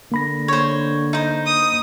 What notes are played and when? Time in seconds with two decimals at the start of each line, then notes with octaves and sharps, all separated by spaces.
0.12 D3 A#3 B5 A#6
0.48 C5 C#5
1.13 D#4 C5
1.46 D#6